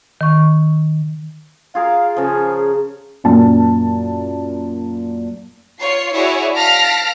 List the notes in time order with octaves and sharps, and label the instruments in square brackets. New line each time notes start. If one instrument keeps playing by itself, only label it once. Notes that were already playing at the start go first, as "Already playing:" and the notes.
[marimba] D#3 C#6
[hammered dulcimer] F4 G#4 A#4 [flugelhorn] F5
[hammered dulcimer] C#3 F3 [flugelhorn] G#4
[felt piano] F#2 A#2 A5
[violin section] F4 C#5 C7
E4 F#4 G#4 C#5 D5
F5 A5 F6 A#6 B6 D7